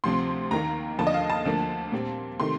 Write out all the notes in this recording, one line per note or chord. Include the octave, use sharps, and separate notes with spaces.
D2 C3 F3 C4 C6
D#2 D#3 A#3 A#5
D#2 D3 F3 A5
D#5
F5
A5
D2 D3 F3 A#3
A#2 G3 C4
C3 D#3 A3 C6